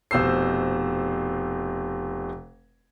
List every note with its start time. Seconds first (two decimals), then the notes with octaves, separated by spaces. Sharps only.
0.11 F1 B2 C5 E6 C7